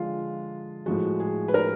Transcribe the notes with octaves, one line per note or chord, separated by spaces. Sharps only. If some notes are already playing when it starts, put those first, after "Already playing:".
Already playing: D3 F3 G#3 F4
A2 F3 G#3 F#4
G#4
B4
A#4